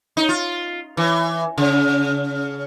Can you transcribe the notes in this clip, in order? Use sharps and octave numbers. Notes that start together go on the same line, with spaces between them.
D#4
F4
E3
C#3